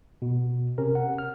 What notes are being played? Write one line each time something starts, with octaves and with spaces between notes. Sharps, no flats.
B2
C3 C#4 A#4
F#5
F6